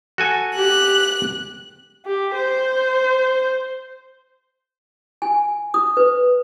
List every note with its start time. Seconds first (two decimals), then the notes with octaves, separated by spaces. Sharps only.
0.18 F#4 A4 G#5
0.57 G4 F#6
2.06 G4
2.34 C5
5.22 G#5
5.74 D#6
5.97 B4